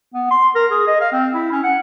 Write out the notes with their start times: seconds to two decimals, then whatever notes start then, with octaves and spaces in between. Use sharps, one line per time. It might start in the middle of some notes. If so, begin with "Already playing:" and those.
0.14 B3
0.31 C6
0.55 A#4
0.71 G#4
0.87 D#5
1.01 F5
1.12 C4
1.34 E4
1.52 C#4
1.64 F#5